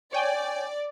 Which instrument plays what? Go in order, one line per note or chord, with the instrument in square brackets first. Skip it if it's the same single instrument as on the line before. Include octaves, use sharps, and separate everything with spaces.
[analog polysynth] C#5 G5 G#5 [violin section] D5